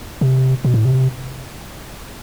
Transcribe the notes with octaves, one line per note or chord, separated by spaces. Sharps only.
C3
B2
A2
C3